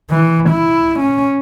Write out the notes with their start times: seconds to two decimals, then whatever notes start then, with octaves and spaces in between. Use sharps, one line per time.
0.11 E3
0.50 E4
0.99 C#4